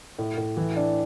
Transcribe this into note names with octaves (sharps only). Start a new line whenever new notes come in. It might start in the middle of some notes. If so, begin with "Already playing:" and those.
A2
A2
E3
D4